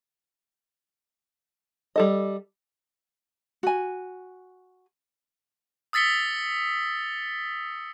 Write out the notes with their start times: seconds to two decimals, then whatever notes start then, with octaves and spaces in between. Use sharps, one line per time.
1.96 G3 A4 D#5
3.63 F#4 G#5
5.93 D#6 E6 A6 B6 C#7 G7